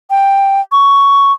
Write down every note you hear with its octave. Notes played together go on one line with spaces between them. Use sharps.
G5
C#6